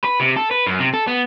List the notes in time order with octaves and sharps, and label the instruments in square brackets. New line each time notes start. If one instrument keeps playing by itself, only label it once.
[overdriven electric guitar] B4
C3
A4
B4
F#2
C3
A4
B3